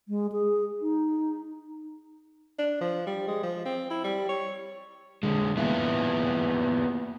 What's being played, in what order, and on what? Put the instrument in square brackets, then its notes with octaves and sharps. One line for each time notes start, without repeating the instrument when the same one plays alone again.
[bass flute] G#3
G#4
D#4
[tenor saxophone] D4
F3
G3
G#3
F3
C4
E4
G3
C#5
[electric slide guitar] D3 G#3
A#3 B3 E4 F4